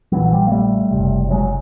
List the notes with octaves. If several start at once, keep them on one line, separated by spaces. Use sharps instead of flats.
A#1 A#2 E3 F#3
F3 G3
A#3
G3 A3
F#1 E2 C3
F#3 G#3